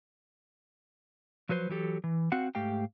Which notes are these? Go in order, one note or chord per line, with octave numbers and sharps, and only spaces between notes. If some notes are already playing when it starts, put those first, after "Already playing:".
F3 F#3 B4 C5
E3 F#3 G4 A4
E3
C4 F#4 F5 F#5
G#2 A3 G4 F5 G5